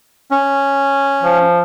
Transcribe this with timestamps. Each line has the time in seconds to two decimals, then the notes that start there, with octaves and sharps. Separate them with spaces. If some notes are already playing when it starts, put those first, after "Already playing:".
0.31 C#4
1.23 F3